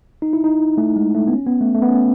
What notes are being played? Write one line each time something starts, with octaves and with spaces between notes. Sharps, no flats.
D#4
E4
D#4
A3
G#3
A3
B3
C#4
B3
A3
A3
B3
C#4